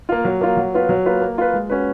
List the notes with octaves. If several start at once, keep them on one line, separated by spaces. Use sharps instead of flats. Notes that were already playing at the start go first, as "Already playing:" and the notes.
A#3 F4
F#3
A#3 F4
F#3
B3 F4 B4
F#3
A#3 F4 B4
A#3
F4 B4
G#3
C#4 F#4 B4